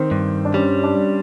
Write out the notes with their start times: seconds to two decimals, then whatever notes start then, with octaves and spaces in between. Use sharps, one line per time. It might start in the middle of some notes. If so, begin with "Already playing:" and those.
Already playing: D#3 C4
0.11 G2
0.45 D4
0.54 G3 C#4
0.84 D4